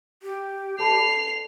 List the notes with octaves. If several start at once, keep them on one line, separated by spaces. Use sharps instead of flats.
G4
A4 A5 B5 C7 F7